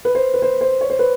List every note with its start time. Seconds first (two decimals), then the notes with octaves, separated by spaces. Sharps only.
0.05 B4
0.15 C5
0.34 B4
0.42 C5
0.61 C5
0.81 C#5
0.90 C5
0.99 B4